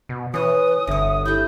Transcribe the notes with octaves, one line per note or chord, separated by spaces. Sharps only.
B2
E3 C#4 B4 C#5 D#6
G1 D3 C#5 E5
E4 G4 A4 G6